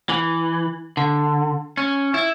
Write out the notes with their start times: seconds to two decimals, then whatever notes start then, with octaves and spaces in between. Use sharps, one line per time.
0.09 E3
0.97 D3
1.77 C#4
2.14 E4